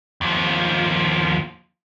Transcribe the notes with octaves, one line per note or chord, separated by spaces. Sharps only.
D#2 F3